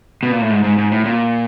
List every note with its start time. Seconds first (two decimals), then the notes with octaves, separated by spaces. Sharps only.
0.23 B2
0.32 A#2
0.41 A2
0.50 G#2
0.64 G#2
0.78 G#2
0.92 A2
1.05 A#2